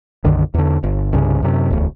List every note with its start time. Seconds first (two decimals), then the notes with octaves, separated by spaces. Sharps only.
0.24 B1 F#2 D3 D#3
0.54 E2 D3
0.83 G1
1.13 C2 G2 C#3
1.42 F#2 C3
1.70 E1 D2